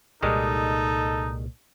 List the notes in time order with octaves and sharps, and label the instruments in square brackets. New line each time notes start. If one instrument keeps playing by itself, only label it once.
[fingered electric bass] C2 A#2 [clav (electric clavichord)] D#3 G3 G#3 [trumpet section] D#4 A4